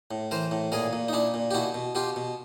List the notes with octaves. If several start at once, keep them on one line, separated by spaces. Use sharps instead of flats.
A2
E3 A#4 C5
A2
A#2 G#4 A#4
A#2
D#4
A#2 D4 E4
A#2
G4
B2 E4 F#4
B2
B2 F4 G4
B2